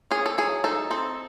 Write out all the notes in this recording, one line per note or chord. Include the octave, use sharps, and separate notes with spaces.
C#4 G#4
A4
F#3 G#4
D#4 A4
C4 A4